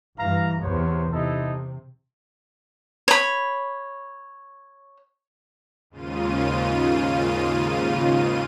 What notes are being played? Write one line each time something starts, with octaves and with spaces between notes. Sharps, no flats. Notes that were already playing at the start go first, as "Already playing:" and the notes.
G2 E3 F5 A#5
E2 C3 B3 C5 C#5
C3 D#4 E4 A4
C#5 B5
D#2 G#2 C#3 F4 D#7